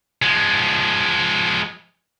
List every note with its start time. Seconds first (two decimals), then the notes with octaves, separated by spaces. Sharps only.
0.22 F3 G#3